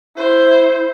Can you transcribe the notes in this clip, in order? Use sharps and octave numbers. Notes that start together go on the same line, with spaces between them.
E4 C5